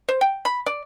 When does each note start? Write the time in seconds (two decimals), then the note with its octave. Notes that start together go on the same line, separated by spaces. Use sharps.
0.09 C5
0.21 G5
0.45 B5
0.66 D5